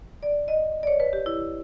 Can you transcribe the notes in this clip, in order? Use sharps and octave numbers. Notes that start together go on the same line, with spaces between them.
D5
D#5
D5
C#5
B4
G4
E4